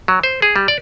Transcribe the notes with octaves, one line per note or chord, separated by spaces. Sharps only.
F#3
C5
G#4
G3
D5